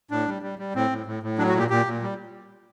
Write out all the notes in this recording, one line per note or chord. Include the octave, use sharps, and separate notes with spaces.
A2 D4
G3
G3
G3
A2 C4
A2
A2
A2
F#3 D4
F#4
A#2 G4
A#2 G4
A#2
G3